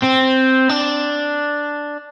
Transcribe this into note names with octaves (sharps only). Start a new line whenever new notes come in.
C4
D4